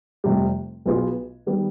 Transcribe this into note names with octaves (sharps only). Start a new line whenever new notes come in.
F1 F2 C3 G3
B1 B2 B3 F4 G#4
D#3 G3 B3